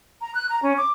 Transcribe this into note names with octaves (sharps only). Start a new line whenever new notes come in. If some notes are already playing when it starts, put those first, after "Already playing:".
A#5
F#6
A#5
C#4
D6